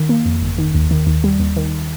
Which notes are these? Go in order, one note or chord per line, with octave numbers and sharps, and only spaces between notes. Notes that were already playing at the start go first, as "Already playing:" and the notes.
Already playing: D#3
A#3
F2
G1
D#3
D#2
D#3
D#2
G3
D#2
D#3